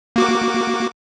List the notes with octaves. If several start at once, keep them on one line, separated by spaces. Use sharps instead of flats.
A#3 F#4 D6